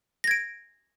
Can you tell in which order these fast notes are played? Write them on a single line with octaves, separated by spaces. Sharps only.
A#6 G#6 D7